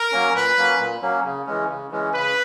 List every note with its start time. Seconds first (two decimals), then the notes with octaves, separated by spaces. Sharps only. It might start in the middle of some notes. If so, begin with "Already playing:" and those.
Already playing: A#4
0.12 F#3 A#3 C#4
0.34 A#2 B4
0.57 F#3 A#3 C#4
0.79 A#2
1.02 F#3 A#3 C#4
1.24 C#3
1.47 E3 G#3 C#4
1.69 C#3
1.91 E3 G#3 C#4
2.14 C#3 B4